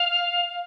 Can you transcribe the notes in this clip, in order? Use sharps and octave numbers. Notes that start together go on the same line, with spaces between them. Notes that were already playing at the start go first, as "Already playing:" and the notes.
Already playing: F5